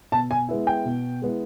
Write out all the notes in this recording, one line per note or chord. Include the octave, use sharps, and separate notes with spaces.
B2 A5
G#5
G#3 B3 E4
G5
B2
G#3 B3 E4